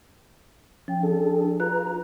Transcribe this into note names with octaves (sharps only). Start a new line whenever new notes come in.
F3 C#4 G5
D4 G#4 A4
F4 B4 A#5 F#6